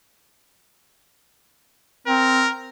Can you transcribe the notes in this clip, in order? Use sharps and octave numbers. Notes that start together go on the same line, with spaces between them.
C4 A#4